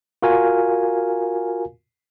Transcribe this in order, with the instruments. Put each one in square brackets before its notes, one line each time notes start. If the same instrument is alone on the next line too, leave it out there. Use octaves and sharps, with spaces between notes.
[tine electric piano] F4 F#4 A#4 F5 G#5